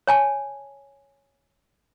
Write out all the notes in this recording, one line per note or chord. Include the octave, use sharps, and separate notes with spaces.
C#5 G#5 A5